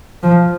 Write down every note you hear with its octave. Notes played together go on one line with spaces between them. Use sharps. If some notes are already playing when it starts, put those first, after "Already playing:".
F3